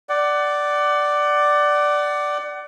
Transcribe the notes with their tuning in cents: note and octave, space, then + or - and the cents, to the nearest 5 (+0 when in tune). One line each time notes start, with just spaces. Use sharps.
D5 +0 F#5 +25